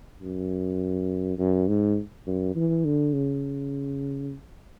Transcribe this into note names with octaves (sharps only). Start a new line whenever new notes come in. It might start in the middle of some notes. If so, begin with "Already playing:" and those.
F#2
F#2
G#2
F#2
E3
D3
C#3